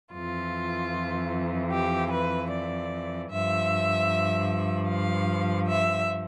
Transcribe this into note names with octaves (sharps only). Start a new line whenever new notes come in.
F2 E3 F4
G4
B4
D5
G2 F3 E5
F5
E5